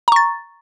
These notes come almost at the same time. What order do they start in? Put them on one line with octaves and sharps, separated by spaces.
A#5 C#6 A6